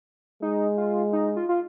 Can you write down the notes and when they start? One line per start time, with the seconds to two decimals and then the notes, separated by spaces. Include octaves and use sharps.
0.42 G#3 D#4
0.78 F4
1.13 D#4
1.36 F4
1.49 F4